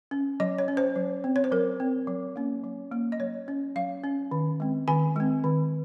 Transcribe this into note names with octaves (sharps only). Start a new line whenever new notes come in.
C#4
F#3 D#5
C#5
C#4
C5
F#3
C4
C#5
C5
F#3 A#4
C4
F#3
A#3 C#4
F#3
A#3 C#4
D#5
F#3 C#5
C#4
F#3 F5
C#4
D#3
G#3 C4
D#3 G#5
G#3 C4
D#3